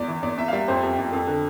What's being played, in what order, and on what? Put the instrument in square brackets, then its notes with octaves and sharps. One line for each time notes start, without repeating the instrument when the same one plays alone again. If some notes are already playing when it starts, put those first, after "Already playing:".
Already playing: [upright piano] E2 D5
E3
E2 D5
E2 E5
F5
G3 E5
F2 C5
F2 G4
F2
F2 A4
D3